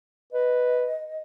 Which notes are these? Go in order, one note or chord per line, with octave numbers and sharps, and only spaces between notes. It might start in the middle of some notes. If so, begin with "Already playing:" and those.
B4 D#5